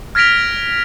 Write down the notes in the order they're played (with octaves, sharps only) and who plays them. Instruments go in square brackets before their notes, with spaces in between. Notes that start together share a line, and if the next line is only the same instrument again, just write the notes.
[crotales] F6 G#6 A#6 B6 D7 F7